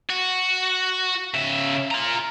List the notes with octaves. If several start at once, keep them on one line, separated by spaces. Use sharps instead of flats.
F#4
C#3 E5
F4 A#5